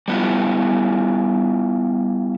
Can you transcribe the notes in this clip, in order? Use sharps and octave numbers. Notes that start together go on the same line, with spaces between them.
G3 B3 E4 F4